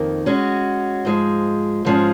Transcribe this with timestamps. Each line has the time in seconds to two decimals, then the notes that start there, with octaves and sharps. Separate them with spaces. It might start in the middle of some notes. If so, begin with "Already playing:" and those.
Already playing: F2 D#3 A#3
0.26 G#3 C#4 F#4
1.05 G#2 F3 G#3
1.85 G#2 F3 G#3 C#4